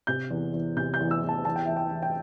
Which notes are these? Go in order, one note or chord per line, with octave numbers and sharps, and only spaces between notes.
C3 G6
E2
E2
C3 G6
G6
E2
E6
E2
A5
E2 A5
G5
E3 E5
G5
E3
G5